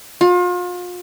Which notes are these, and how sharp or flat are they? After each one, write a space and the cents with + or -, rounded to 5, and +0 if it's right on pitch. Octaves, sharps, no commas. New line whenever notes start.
F4 +35